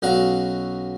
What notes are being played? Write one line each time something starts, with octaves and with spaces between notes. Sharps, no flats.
B1 C#4 F#4 F5 A#5 C#6